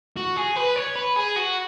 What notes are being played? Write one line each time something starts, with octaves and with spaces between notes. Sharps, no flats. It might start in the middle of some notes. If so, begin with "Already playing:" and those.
F#4
G#4
B4
C#5
B4
G#4
F#4